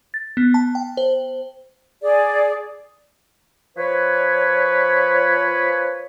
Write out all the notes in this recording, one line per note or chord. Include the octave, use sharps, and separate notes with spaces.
A6
B3
A5
G5
C5
G#4 D5
F3 B4 C#5